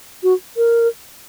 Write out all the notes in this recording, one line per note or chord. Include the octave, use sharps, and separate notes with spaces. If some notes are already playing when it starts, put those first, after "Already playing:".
F#4
A#4